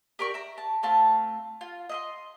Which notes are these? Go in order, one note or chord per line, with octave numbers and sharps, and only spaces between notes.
G4 A#4 D5 C#6
E5 A#5
A5
A3 C4 F4 A5
F4
D#5 E5 C6